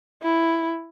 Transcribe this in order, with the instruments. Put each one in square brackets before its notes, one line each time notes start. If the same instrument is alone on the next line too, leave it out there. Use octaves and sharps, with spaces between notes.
[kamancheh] E4